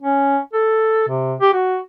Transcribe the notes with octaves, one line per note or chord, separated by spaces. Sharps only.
C#4
A4
C3
G4
F#4